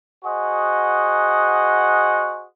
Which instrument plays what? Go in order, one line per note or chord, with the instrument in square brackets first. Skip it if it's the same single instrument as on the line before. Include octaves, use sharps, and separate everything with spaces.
[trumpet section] F#4 G#4 C5 D#5 F#5